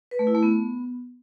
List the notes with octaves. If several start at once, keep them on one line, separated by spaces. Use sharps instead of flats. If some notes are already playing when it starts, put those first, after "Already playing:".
B4
A3
E4
A3
B3